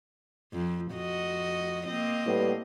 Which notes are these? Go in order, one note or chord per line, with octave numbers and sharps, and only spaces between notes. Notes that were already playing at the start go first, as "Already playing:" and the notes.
F2
F2 F#4 D#5
A#3 C4 D#5
A2 G3 B3